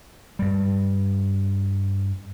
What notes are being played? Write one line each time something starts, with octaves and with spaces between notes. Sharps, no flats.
G2 G3